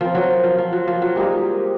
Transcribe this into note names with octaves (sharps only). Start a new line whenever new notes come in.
F3 C4 F4 A#4
F#3
F3
F3
F#3
F3
F#3
G3 G#3 A#3 D#4 G4